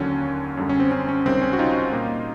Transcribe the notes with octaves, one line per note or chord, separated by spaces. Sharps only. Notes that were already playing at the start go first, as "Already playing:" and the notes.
Already playing: D#2 D3 F#3 C#4
F#2 D3 G3
C#4
C4
C#4
C#4
C#2 C3 D#3 G3 C4
C#4
F#4
D#4 F4
A#2 G3 A#3